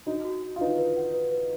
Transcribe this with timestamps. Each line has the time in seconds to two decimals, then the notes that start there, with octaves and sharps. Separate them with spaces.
0.06 D#4 F#4
0.25 F#4
0.43 F#4
0.56 F4
0.61 D#4 B4
0.78 B4
0.97 F#5
1.14 B4
1.32 B4